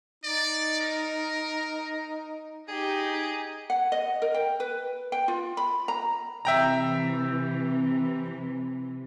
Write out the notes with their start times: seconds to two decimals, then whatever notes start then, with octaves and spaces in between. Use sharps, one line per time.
0.24 D#4 D5
0.80 A#4
2.68 D#4 G4 G#4
3.70 F#5
3.92 D#5
4.22 A#4
4.34 G5
4.60 B4
5.12 G5
5.28 F4
5.57 B5
5.88 A#5
6.45 C3 E3 E5 G5 A#5